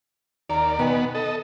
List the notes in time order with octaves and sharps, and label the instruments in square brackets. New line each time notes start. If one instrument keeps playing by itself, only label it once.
[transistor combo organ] D#2 D5 [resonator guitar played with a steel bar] A#4 A#5
[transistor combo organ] B2 B3 [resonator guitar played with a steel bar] D#3 G#5
[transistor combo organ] A4 D#5